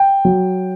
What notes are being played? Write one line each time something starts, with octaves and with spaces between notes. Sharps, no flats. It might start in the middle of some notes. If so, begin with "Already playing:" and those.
Already playing: G5
F#3